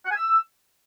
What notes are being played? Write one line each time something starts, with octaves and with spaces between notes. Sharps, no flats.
F#5
G#5
E6